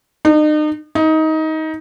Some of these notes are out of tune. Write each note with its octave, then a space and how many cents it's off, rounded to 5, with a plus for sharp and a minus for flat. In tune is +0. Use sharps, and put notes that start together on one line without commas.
D#4 -40
D#4 +20